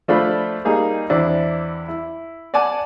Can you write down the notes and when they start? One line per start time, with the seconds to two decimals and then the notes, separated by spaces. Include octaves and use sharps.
0.08 F3 A3 D4 F4 A4 B5
0.65 G3 A#3 D#4 G#4
1.10 E2 C4 D4 E4
1.88 E4
2.54 D5 F#5 G#5 A5 D6